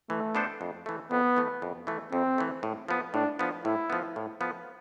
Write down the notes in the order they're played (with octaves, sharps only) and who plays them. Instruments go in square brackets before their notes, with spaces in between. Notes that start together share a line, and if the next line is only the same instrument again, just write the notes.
[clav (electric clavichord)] E3 [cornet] A3
[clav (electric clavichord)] B3 D4 A4 C5
F2
E3 A3
[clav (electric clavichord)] F2 [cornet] B3
[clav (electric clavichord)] E3 A3
F2
E3 A3
[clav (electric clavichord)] F2 [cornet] C4
[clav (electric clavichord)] E3 A3
A2
F3 B3
[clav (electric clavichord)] A2 [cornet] D4
[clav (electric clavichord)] F3 B3
[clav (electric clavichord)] A2 [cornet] E4
[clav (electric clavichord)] F3 B3
A2
F3 B3